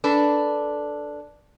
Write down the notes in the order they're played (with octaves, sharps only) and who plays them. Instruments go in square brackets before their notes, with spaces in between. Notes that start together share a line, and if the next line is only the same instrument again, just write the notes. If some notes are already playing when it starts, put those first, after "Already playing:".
[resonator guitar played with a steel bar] D4 A4 B4